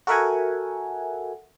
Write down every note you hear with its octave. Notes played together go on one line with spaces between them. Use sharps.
F#4 A4 A#4 E5 F#5 G#5